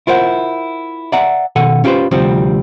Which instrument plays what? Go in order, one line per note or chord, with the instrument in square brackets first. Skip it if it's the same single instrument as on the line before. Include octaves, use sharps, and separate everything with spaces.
[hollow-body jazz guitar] E4 F4 A#4 C5 D#5 F#5
D5 E5 F#5 A#5
B2 D#3 A4 F#5 G#5
C#4 F4 G4 G#4 B4 C5
D2 C3 F3 G3 C4